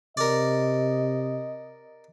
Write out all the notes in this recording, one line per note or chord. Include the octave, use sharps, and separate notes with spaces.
C3 A#4 D5 D#5